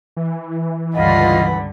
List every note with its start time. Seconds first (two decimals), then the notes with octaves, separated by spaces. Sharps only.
0.17 E3
0.95 C#2 G2 D3 F4 D#5 F#5 B5